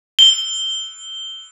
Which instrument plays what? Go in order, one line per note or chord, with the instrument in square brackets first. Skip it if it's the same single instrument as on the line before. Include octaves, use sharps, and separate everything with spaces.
[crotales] G7